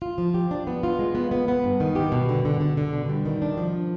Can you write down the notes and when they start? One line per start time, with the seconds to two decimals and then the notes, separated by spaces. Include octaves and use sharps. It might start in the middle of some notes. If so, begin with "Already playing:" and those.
0.02 F4
0.18 F3
0.34 G4
0.51 D4
0.67 B3
0.83 F4
0.99 G#3
1.15 B3
1.31 B3
1.48 B3
1.64 G2
1.80 D#3
1.95 G4
2.12 B2
2.29 D3
2.45 D3
2.60 D3
2.77 D3
2.93 B2
3.09 G3
3.26 D#3
3.42 D4
3.57 F3